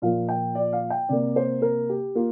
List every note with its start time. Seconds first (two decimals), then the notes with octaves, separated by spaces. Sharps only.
0.02 A#2 F3 A#3 F5
0.29 G5
0.55 D5
0.73 F5
0.90 G5
1.09 C3 A#3 D5
1.36 C5
1.62 A#4
1.89 G4
2.15 A#3 F4